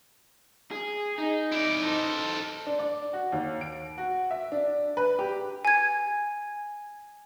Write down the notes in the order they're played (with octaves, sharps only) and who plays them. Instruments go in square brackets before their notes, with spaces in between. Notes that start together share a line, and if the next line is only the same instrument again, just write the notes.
[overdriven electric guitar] G#4
D#4
[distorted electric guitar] E4 D5
A4 C5
[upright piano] D4
D5
F#4
D#2
D7
F#4
E5
D4
B4
G4
[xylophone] G#5 G#6